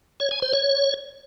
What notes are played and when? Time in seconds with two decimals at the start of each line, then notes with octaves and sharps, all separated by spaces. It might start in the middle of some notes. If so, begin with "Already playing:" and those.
0.20 C#5
0.31 G#5
0.42 C5
0.53 C#5